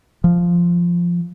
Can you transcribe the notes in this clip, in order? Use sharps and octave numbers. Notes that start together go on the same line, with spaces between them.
F3